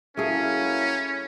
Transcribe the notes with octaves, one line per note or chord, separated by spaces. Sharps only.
F#3 A3 A#3 C#4 E4 G#4